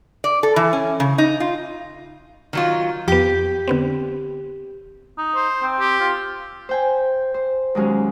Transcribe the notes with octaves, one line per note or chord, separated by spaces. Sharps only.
D5
A4
E3
C#4
C#3
D#4
F4
D#3 F#3 F4
F2 B3 G4
D3 B3 C4
D#4
C5
C4
G4
F4
C5 G5 G#5
C5
D#2 F#3 G#3 C#4 G#4